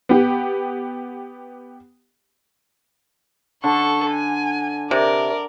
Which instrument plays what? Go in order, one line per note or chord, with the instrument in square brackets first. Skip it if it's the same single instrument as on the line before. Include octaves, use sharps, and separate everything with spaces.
[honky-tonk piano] B3 G4
[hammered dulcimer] D3 [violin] A4 C#6
[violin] G#5
[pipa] C3 [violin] A#4 D5